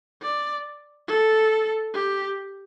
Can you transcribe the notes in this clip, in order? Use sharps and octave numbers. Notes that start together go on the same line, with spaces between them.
D5
A4
G4